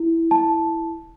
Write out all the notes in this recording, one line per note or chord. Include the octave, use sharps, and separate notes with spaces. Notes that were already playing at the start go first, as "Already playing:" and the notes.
Already playing: E4
A5